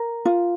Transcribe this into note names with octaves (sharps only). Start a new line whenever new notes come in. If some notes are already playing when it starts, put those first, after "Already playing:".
Already playing: A#4
F4